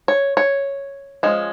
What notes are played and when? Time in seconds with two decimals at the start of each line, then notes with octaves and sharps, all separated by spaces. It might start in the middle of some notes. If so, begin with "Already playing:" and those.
0.08 C#5
0.37 C#5
1.23 F3 G#3 C#4